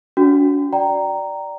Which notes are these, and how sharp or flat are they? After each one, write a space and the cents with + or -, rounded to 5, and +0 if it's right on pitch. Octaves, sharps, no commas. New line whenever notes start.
D4 -45 F#4 -5
D5 +0 G5 -20 A#5 -5